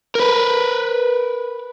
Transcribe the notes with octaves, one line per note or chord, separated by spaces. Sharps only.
A#4 B4